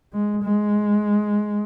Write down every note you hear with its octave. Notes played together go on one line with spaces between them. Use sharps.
G#3
G#3